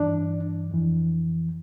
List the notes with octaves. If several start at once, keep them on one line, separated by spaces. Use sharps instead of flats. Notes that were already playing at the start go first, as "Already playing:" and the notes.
Already playing: G2 E3 D4
F2 E3